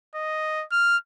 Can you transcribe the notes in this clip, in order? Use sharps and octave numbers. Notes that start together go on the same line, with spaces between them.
D#5
F6